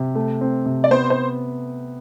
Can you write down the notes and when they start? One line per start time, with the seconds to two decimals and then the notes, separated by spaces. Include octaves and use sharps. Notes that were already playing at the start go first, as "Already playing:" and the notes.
Already playing: C3
0.15 A3
0.41 C4
0.66 C3
0.84 D5
0.91 B3 C5
1.10 C5